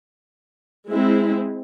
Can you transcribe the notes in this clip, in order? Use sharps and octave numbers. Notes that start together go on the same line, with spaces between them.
G#3 C4 E4